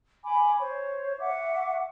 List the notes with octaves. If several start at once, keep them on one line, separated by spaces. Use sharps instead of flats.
G#5 B5 D6
C5 C#5 C#6
E5 F#5 C#6 D6